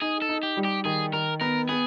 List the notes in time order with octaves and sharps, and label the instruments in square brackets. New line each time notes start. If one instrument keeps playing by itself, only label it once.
[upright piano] D#4 [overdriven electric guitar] G#4
[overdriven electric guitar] A4
[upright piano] D#4
[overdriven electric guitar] G4
[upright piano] G3
[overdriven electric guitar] G4
[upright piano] D#3 [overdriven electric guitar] G#4
[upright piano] D#3 [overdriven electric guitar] A#4
[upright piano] B3 [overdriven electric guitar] A#4
[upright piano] B3 [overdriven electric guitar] G#4